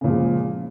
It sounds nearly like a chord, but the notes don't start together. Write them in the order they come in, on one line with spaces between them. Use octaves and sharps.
C#3 A#2 F3 G#3